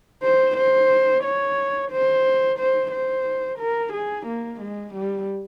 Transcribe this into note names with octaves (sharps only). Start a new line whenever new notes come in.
C5
C5
C#5
C5
C5
C5
A#4
G#4
A#3
G#3
G3